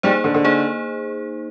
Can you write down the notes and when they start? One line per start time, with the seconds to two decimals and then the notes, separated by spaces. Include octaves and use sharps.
0.03 G3 A#3 D#4 G#4 C5
0.24 D3
0.34 D3
0.45 A#3 D#4 G#4 C5